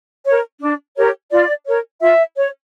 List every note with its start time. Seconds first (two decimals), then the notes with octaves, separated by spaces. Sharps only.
0.26 A#4 C#5
0.61 D4
0.96 G4 A#4 C#5
1.31 F4 D5
1.66 A#4 C#5
2.00 F4 E5
2.35 C#5